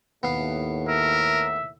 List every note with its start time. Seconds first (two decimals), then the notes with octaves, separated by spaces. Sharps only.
0.23 D#2 A2 B3 F5
0.88 A#4 E5